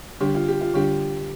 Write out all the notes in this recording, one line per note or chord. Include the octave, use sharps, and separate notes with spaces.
D3 G3 D4 G4
F4
G4
F4
D3 G3 D4 G4